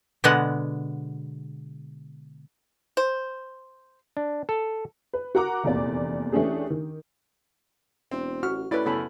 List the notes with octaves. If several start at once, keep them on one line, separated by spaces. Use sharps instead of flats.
B2 D3 G#3 B3 F#5
C5
D4
A4
B4
F#4 A#4 F#5 A#5 D6
F1 E2 A#2 D5
E3 A3 C#4 D4 G4 G#4
D#3
E1 C4
A1 F#4 F6
A2 C#4 E4 B4 D5
F#2 C#3 B3 A4 B5